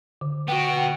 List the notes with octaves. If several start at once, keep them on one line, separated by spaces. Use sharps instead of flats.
D3
B3 F#4 G5